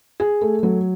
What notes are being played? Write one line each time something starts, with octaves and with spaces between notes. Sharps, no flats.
G#4
A3
F#3